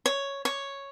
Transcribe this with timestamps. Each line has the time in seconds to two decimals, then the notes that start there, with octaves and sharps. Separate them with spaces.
0.06 C#5
0.45 C#5